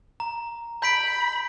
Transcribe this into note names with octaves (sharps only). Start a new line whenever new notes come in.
A#5
B5 G6 B6 D7